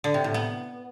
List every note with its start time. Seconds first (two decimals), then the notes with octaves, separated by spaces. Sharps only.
0.04 D3
0.14 C3
0.24 A2
0.34 B3